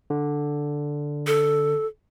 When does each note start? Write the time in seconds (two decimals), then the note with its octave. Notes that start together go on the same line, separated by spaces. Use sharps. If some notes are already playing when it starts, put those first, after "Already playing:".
0.10 D3
1.27 A4